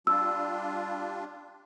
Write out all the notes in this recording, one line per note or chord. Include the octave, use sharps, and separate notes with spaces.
G3 D4 F4 E6